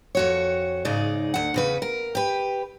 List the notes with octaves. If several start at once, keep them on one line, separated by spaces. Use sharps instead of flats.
F2 F#4 C#5
G#2 C#3 D#4 D5
D2 F#5
E2 C#3 B4
A#4
G4 B4